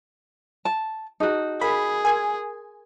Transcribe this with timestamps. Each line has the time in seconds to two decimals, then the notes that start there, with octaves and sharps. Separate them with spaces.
0.65 A5
1.20 D#4 E4 F#4 G#4 A5
1.61 G#4 A#4 F5 B5
2.05 A#4 G#5 C6